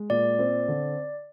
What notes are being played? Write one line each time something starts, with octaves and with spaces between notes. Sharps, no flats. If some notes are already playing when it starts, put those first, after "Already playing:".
Already playing: G#3
A#2 D5
C4
D3